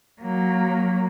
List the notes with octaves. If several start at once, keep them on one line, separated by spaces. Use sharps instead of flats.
F#3 A#3